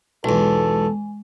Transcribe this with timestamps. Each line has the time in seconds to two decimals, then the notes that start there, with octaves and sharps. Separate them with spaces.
0.24 B1 E2 G#3 A4